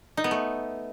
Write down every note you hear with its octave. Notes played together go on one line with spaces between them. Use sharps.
D#4
B3
A3